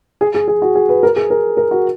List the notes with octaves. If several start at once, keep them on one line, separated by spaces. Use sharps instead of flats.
G#4
G#4
G#4
F#4
G#4
B4
A#4
G#4
A#4
A#4
F#4